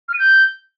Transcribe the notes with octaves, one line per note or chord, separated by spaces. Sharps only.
F6
D#7
G6